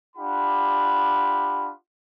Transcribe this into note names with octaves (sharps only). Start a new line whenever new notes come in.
D4 F4 G4 F#5 B5